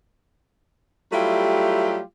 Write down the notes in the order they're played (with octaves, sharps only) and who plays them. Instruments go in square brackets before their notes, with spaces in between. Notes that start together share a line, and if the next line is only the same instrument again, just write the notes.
[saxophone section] F#3 G3 A3 E4 F4 G4